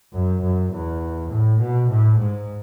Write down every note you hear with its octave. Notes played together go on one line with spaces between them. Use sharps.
F#2
F#2
E2
A2
B2
A2
G#2